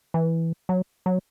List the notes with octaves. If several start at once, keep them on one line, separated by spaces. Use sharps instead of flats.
E3
F#3
F#3